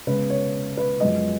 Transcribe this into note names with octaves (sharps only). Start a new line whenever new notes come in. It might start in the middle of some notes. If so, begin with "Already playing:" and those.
C#3 G#3 B3 B4
C#5
B4
F#2 F3 G#3 B3 D#5